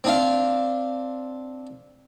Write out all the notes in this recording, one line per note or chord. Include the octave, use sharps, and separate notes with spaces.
C4 D4 F5